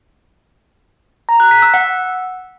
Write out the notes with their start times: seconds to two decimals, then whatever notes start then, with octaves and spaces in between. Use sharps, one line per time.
1.29 A#5
1.40 F#6
1.51 B6
1.62 E6
1.74 F#5